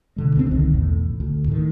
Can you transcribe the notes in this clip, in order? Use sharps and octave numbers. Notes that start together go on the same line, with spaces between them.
B2 D3 G#3
D2 G#3 C4
C2 D3 D#3
B1 E2 A2
D2
A2 D#3